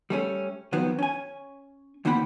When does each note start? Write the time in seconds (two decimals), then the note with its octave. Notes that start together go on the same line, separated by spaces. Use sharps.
0.10 G3 A3 C#4
0.72 F2 D#3 F#3 B3 C4
0.99 C#4 G#5
2.05 D2 D#3 A#3 C4 F#5 B5